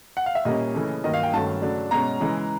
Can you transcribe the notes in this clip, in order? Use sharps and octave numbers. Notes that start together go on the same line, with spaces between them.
F#5
F5
E5
A#2 G3 A#3 C#4 D#5
C#3 E3 A3 C#4
G2 D#3 F#3 A#3 D#5
F5
G5
G2 D#3 F#3 A3 C#4 A5
C#3 F#3 A3 D4
B2 G#3 C#4 A#5
C#3 E3 G#3